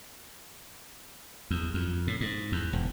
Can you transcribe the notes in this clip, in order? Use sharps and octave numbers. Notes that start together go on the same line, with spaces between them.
E2
F2
A2
G#2
E2
E1